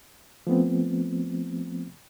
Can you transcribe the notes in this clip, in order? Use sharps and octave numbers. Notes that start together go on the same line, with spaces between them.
F3 A3 B3 C4